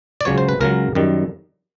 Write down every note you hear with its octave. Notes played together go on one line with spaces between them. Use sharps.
D5
C#2 C#3 F#3 C#5
C5
B4
C#2 C#3 F#3 A#4
F#2 D#3 G3